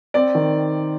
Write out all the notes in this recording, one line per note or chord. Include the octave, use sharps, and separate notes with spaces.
C4 D5
D#3